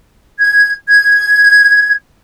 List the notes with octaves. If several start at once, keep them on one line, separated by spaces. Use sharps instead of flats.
G#6
G#6